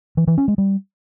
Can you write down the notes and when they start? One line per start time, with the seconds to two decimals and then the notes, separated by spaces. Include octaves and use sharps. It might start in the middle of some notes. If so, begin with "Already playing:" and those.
0.17 E3
0.27 E3
0.38 C#4
0.48 G#3
0.58 G3